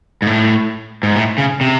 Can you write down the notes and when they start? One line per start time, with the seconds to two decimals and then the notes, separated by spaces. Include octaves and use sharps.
0.22 G#2
0.27 A2
1.03 G#2
1.16 A2
1.38 C#3
1.61 C3